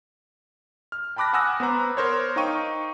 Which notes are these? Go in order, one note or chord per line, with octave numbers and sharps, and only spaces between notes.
F6
G5 A5 B5 D6 F#6 A#6
F#5 G#5 D#6 E6 F#6 A#6
B3 B4 C5 A#5
A#4 C5 C#5
D#4 F5 G5 C#6 D#7